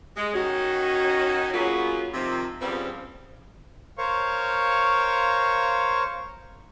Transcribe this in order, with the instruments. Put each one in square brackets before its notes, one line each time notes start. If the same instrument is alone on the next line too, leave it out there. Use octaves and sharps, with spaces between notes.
[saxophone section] G#3
D#3 C#4 D#4 F#4
F#3 A#3 B3 C#4 F4 G#4
C3 D#3 F3
C#3 F3 G3 B3 C4
[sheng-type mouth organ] A#4 C5 C#5 F5 C#6